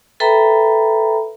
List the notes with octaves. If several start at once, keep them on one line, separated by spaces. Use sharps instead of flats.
A4 B4 E5 G5 A#5 B5